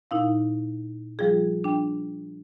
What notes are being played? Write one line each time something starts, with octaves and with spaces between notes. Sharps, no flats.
A#2 D#4 E4 F5
F3 G3 F4 G#4
D4 G5